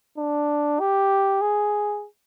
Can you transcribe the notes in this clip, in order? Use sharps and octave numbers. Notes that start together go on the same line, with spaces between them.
D4
G4
G#4